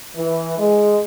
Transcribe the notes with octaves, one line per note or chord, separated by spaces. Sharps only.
E3
G#3